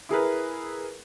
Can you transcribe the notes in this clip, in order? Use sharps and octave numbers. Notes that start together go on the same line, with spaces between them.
E4 G#4 A#4 B4